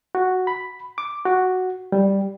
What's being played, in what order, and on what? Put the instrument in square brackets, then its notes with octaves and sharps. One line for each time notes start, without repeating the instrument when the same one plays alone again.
[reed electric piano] F#4
B5
D6
F#4
G3